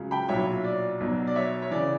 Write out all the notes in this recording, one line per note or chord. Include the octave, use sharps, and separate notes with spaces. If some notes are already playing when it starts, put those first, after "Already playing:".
Already playing: C#2 C#3 F#3
G5 B5
B1 A#2 F#3 C#5 E5
D5
B1 B2 F#3
D5
C#5 E5
C#5
C#3 E3 D5